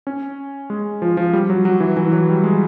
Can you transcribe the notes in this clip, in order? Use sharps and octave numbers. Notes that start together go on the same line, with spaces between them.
C#4
G#3
F3
F3
G3
F#3
F#3
E3
E3
F#3
G3
G#3